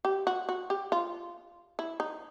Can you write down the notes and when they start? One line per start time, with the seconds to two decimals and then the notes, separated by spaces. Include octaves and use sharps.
0.05 G4
0.27 F#4
0.49 F#4
0.70 G4
0.92 F4
1.79 E4
2.00 D#4